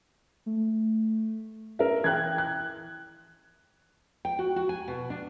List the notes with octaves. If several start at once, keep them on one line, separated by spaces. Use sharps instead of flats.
A3
C#4 A#4 E5
E3 G5 F#6 G#6
F#6
G5
F#4
F#4
G#5
B2
D4